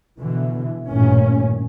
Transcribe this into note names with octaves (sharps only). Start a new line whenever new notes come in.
B2 D3 E3
A1 G2 A#2 D#3 C#4